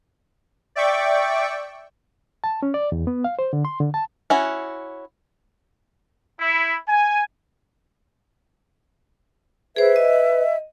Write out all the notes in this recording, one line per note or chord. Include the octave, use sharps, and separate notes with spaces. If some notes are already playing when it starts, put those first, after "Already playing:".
D5 E5 G5 C#6 D6
A5
C#4
D5
E2
B3
F5
C5
D3
C6
D3
A5
C#4 E4 F#4
E4
G#5
G#4 B4 C5 E5
D#5